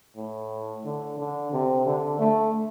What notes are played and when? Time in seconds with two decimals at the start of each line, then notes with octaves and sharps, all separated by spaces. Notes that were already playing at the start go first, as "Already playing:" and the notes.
0.16 A2
0.85 D3
1.19 D3
1.52 C3
1.86 D3
2.19 A3